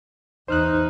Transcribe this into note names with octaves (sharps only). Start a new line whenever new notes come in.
E2 D#4 C5 F6 F#6